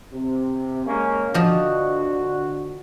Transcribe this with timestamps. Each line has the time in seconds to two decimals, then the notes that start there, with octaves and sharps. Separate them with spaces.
0.12 C3
0.86 G#3 A#3 C#4
1.34 D3 F3 F#4 D#5